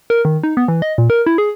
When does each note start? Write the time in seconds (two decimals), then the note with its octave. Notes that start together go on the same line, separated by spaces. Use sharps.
0.10 A#4
0.25 D#3
0.44 D#4
0.57 B3
0.68 E3
0.82 D#5
0.98 A#2
1.10 A#4
1.26 E4
1.38 G#4